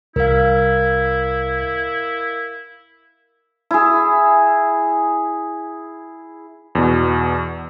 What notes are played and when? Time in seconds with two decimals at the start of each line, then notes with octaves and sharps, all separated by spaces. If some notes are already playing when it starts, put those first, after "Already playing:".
0.16 C2 E4 A#4 F5
3.71 E4 G#4
6.75 E2 B2